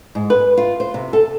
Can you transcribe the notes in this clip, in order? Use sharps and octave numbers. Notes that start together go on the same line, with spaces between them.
G#2
B4
F4
C5
C3
A4